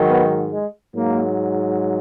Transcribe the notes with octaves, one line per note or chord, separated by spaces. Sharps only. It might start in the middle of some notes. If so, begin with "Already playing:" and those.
Already playing: G#2 D#3 F#3
B3
G#3
G#2 F#3 A#3